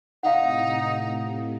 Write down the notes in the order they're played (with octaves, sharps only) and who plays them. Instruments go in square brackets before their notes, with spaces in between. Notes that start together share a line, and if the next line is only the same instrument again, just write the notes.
[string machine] A2 C3 [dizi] D#4 [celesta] F5 F#5